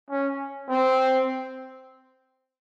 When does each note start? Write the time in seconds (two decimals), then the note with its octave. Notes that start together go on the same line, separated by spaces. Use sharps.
0.10 C#4
0.70 C4